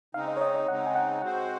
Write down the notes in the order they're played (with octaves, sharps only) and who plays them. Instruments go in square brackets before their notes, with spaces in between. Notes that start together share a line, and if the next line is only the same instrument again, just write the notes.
[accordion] C#3 G#3 C4 D#4 [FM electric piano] F5
[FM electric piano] D#5
C#5
D#5
D#5
[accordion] C#3 G#3 C4 D#4 [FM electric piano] F#5
[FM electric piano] G#5
F#5
[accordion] G#3 C4 F#4 C5 [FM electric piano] F#5